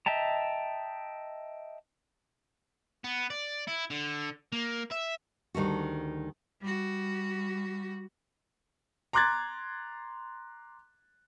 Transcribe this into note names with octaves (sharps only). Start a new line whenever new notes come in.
D#5 E5 G5 A5 A#5
B3
D5
E4
D3
A#3
E5
D2 D#3 G3 F#4
G3 F#4
A#5 C6 D6 F#6 G#6 A6